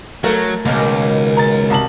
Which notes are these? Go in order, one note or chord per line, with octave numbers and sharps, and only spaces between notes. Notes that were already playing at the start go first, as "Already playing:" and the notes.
F#3 A3 A#4
C#2 B2 D#3 A#3
A#5 A6
C2 A5 F#7